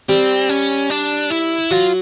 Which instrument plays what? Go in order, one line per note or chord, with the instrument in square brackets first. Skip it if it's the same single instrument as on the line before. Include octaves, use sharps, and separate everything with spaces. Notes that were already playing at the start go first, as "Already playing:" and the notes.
[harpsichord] G3 G4 [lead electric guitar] C4
[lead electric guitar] C#4
D4
E4
[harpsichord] F#3 F#4 [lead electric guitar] F4